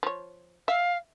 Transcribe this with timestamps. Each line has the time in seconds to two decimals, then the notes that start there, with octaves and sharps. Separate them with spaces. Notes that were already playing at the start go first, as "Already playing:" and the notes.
0.03 F3 C#5
0.68 E5 F5